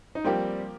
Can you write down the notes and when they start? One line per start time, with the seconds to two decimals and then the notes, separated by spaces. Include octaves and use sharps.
0.15 D#4
0.24 F3 G3 A#3 C4 G4